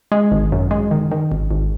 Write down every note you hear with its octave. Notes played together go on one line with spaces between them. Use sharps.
G#3
G#1
F#2
G#3
D#3
D#3
G#1
G#1